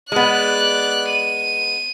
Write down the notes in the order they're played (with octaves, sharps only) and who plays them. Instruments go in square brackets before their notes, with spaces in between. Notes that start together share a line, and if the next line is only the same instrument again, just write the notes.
[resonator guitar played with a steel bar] G#3 B3 [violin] D5 F#6
[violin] D#7